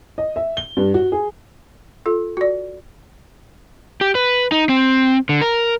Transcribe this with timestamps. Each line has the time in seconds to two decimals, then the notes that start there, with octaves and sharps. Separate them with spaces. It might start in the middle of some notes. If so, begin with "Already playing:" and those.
0.18 D#5
0.36 E5
0.57 G7
0.77 G2
0.94 F#4
1.12 G#4
2.06 F4 A4
2.37 F#4 D5
4.01 G4
4.15 B4
4.52 D#4
4.69 C4
5.29 D3
5.42 A#4